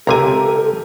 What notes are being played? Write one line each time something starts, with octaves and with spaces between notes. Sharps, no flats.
C#2 C3 G4 A4 A#4 G#5 A#5